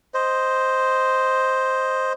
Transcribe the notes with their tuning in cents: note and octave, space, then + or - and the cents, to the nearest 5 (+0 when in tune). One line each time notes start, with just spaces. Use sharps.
C5 +0 D#5 +0